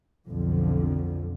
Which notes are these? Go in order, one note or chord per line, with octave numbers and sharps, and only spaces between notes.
B1 F2 D3 F3